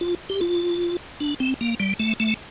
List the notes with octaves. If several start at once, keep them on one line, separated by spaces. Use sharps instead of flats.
F4
G4
F4
D4
C4
A#3
G3
A3
A3